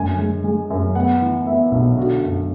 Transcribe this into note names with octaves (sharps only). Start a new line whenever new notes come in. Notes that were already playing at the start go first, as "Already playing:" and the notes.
Already playing: F#2 D3 G#5
G#3
G#3
F#2
B3 F#5
E3
B3 E5
B1
D3 F#4
F#2